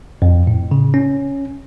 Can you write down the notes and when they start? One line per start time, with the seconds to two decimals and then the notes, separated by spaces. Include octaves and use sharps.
0.22 F2
0.47 A2
0.71 C#3
0.94 C#4